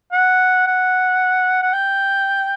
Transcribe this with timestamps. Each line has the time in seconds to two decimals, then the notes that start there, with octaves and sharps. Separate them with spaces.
0.12 F#5
0.67 F#5
1.62 F#5
1.73 G5